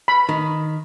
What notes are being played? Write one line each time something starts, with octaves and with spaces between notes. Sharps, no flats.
B5
D#3